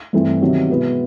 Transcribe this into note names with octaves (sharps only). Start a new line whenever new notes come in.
G2 E3 A3 C4 E4
C3 D#3 F#3 B3 E4
B2 G#3 B3 E4